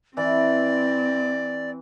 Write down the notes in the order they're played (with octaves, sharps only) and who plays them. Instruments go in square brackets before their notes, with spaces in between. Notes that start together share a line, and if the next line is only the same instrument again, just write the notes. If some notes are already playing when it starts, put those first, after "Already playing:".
[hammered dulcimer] E3 [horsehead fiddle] C4 [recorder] D5